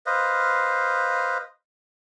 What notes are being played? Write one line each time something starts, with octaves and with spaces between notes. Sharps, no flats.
B4 C5 D#5 F5